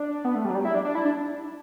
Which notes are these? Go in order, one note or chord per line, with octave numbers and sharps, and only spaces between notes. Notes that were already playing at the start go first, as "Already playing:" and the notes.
Already playing: D4
B3
A3
G3
F#3
G3
E4
D4
D4
E4
D4